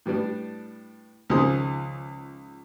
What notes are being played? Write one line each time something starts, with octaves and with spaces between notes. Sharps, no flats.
A2 G3 B3 D4
C#2 D#3 F3 G#4 C5 D#6